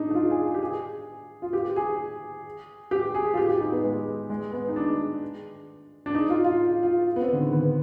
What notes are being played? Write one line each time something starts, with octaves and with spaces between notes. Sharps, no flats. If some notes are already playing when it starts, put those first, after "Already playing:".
Already playing: D4 D#4
D#4
F4
G#4
G#4
G4
G#4
F4
G4
G4
G#4
G4
G#4
F4
G4
G4
D#4
B3
G#3
G#3
B3
D#4
D4
D4
D#4
F4
F4
F4
B3
C4
D3
D#3
B3